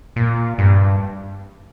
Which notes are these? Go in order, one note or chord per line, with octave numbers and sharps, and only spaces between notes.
A#2
G2